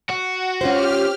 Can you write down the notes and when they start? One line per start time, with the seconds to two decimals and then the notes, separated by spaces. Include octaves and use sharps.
0.10 F#4
0.61 C#4 F4 G4 C5 F6